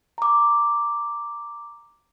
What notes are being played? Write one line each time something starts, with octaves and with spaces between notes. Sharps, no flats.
A#5 D6